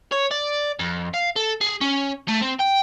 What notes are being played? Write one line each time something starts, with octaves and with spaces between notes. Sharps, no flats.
C#5
D5
F2
F5
A4
G#4
C#4
A3
C4
G5